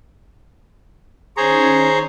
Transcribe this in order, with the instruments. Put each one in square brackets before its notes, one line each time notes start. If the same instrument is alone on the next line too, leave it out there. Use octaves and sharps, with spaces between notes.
[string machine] D#3 C#4 D#4 [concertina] G#4 A#5 [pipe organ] C5 C#5